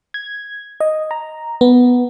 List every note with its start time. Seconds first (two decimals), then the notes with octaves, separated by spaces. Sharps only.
0.14 G#6
0.80 D#5
1.11 A#5
1.61 B3